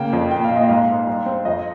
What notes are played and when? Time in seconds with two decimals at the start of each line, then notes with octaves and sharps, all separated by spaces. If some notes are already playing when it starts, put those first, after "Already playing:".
Already playing: C#3 A#3 G5
0.13 F2
0.31 A#2 G5
0.44 F5
0.51 A#2
0.56 D#5
0.69 G#2 F5
0.88 G#2
1.07 G3
1.26 C4
1.45 F2 D#5